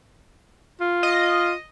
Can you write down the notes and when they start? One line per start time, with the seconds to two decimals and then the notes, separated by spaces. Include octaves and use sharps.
0.81 F4
1.03 D#5